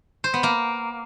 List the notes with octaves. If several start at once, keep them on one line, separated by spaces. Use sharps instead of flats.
C5
B3
A#3